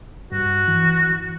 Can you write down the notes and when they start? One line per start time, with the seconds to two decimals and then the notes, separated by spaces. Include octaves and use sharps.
0.32 G2 F#4
0.68 E3